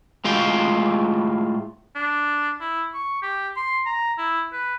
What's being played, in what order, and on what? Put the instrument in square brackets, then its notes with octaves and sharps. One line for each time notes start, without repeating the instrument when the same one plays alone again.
[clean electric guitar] A2 G#3 F4 F5 G5
[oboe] D4
E4
C#6
G4
C6
A#5
E4
B4